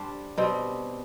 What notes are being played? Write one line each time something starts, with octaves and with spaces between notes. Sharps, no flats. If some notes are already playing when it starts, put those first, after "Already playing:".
Already playing: G3 D4 A4 C5
B2 G3 C4